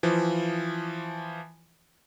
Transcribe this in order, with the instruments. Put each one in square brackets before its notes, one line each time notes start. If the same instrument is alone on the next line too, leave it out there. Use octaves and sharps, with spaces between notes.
[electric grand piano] E3 F3